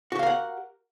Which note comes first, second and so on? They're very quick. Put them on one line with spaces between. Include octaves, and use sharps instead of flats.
F#4 G4 F5 A#4 F#5